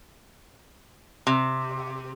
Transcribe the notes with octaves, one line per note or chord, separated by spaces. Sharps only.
C3